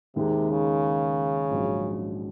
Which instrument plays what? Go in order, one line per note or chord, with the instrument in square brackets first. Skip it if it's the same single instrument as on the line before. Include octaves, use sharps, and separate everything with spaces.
[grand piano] D#2 D#3 G#3 D#4 [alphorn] C3
[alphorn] C#3
[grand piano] A#1 G#2 F#3 C#4